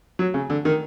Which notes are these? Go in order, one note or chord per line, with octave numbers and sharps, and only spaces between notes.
F#3
C#3
D3
D#3